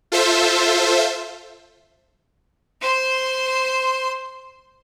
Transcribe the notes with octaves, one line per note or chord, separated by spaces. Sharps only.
F4 A4 C5 E5
C5 C6